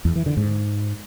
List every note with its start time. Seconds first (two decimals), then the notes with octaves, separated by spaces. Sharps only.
0.05 E2
0.16 E3
0.26 D3
0.37 G#2